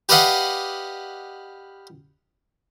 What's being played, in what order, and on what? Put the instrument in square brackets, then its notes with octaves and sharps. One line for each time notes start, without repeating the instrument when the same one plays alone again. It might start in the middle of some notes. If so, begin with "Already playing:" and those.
[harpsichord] G4 B4 D5 D#5 F5 F#5